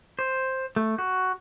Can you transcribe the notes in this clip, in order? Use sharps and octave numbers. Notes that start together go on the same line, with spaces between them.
C5
A3
F#4